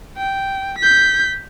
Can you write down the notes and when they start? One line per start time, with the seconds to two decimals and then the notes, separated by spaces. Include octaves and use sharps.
0.17 G5
0.79 G6 B6